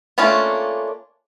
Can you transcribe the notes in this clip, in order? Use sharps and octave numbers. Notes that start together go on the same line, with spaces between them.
A3 A#3 C#4 D4 F4